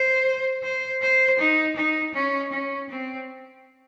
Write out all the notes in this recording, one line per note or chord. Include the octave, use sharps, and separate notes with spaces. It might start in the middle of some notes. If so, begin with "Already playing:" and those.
Already playing: C5
C5
C5
D#4
D#4
C#4
C#4
C4